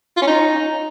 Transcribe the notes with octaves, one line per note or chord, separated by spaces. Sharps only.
F4
C#4
D#4